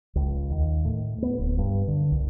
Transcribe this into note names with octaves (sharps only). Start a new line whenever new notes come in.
C#2
D#2
A2
B3
D1
G2
D3
C2